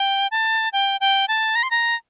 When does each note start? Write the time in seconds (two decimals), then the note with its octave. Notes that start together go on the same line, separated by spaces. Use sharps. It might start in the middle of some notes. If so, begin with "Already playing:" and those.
Already playing: G5
0.31 A5
0.73 G5
1.00 G5
1.28 A5
1.55 A#5
1.63 C6
1.71 A#5